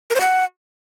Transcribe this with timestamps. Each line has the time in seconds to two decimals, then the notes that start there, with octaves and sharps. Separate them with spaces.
0.10 A#4
0.15 C5
0.20 F#5